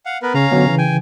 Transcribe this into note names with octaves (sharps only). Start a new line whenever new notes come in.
F5 F#5
B3 A#4 B4
C#3 C#4 F5 A#5
D3 F#3 B3
C#3 E3
G5 G#5